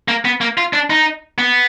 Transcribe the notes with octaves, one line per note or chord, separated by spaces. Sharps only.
A#3
B3
A#3
F4
D4
D#4
B3